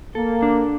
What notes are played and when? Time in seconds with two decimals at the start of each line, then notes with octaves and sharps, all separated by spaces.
0.15 A#3 A4
0.42 D4